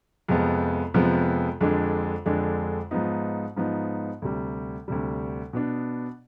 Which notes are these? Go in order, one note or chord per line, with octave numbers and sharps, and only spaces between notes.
F2 C3 F3 G#3 B3
F2 C3 F3 G#3 B3
F2 D3 G#3 D4
F2 D3 G#3 D4
G#2 F3 B3 D#4
G#2 F3 B3 D#4
D2 C3 G3
D2 C3 G3
B2 B3 D4